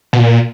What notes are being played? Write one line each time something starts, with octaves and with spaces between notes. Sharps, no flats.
B2
A#2